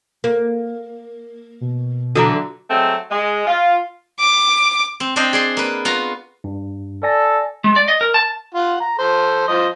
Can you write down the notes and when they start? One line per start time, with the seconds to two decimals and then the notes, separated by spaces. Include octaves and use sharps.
0.24 A#3
1.61 B2
2.16 D3 E3 F#3 F#4 A#5
2.70 F#3 G#3 A3 C4
3.10 G#3
3.46 F4
4.20 D6
5.00 C4
5.16 C4 D4 C5 D#5 G5
5.33 G#4 D5 C6
5.57 A#3 B4
5.85 B3 F4 F#4 A#5
6.44 G2
7.03 A4 D5 G#5 A#6
7.64 G#3
7.76 D5
7.88 D#5
8.01 A#4
8.14 A5
8.54 F4 F#5
8.80 A#5
8.98 A4 C5
9.48 F3 C5 D#5